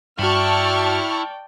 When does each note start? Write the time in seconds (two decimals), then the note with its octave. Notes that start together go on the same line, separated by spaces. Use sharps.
0.19 G2 E4 F#4 D5 G5 A5 C#6 F6